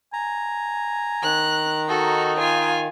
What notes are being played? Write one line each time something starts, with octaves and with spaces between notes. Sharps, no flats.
G#5 A#5
D#3 F#6
D#4 F#4 A4
F4 G#5